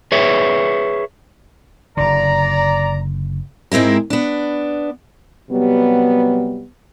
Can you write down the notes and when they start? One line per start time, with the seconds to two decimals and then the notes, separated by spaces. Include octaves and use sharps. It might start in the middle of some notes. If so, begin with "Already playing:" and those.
0.12 G#4 B4 C#5 E5
1.97 F#1 D3 D5 A#5
3.72 G#2 G#3 C4 E4 A#4
4.10 B3 D4
5.50 C3 F#3 G3 B3